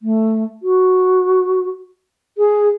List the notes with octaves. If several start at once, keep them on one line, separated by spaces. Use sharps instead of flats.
A3
F#4
G#4